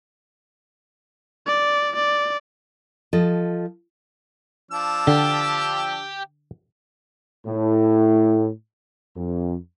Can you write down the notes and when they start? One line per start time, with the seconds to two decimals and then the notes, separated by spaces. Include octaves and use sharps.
1.46 D5
1.95 D5
3.13 F3 A4 D#5
4.71 F3 D4 E6
5.07 D3 G4
7.47 A2
9.16 F2